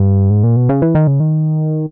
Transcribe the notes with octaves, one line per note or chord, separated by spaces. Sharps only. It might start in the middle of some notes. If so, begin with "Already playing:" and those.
Already playing: G2
G#2
A#2
B2
C#3
E3
D#3
C#3
D#3